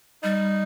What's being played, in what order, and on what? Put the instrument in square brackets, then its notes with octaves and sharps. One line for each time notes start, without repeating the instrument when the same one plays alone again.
[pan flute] G3 [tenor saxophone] D#4